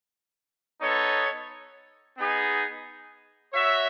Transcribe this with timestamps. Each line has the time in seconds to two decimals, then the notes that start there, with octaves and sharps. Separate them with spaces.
0.81 B3 D#4 A4 C#5
2.17 B3 D#4 G#4
3.54 F#4 C#5 E5